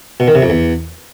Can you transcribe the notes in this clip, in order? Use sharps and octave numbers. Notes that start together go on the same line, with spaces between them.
B2
D#3
C3
F2
E2